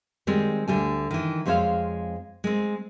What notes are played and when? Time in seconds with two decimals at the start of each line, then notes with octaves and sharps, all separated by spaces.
0.27 D#3 G3 G#3 C4
0.68 D2 D3 G3 G#5
1.11 D#3 E3
1.46 F2 G#3 C4 C5 C#5 F5
2.44 G#3 C4